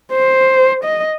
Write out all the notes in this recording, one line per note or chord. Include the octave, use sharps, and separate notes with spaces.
C5
D#5